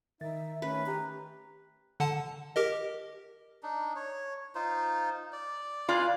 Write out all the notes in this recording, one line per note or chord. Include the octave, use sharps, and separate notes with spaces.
D#3 D#4 E5 A6
A3 C#4 B4
G4 A#5
D3 F#5 A5
G4 A#4 D#5
D4 D#4
C#5
D#4 F4 C5
D5
F4 B4 D5 F5 G#5